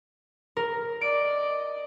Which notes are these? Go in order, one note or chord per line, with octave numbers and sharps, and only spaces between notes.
A#4
D5 D#5 D7